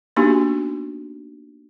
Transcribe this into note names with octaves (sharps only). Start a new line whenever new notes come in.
A#3 B3 D4 D#4 F#4 G4